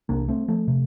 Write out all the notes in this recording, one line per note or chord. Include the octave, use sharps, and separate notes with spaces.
C2 C3 A#3 D4
A3 C4
F3 A3
C3